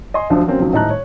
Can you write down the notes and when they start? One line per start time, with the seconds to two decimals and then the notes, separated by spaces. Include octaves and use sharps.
0.14 D#5 G#5 C6
0.30 D2 D3 F3 F#3
0.47 F#3 A#3 C4 C#4
0.59 C#2 D#3 F3 F#3
0.72 D#1 A2 D#4 A5 A#5 F#6
0.90 C#5